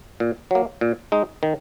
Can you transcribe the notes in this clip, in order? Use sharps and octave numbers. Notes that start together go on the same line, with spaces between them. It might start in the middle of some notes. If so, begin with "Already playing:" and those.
A#2
F#3 A#3
A#2
G#3 D#4
D#3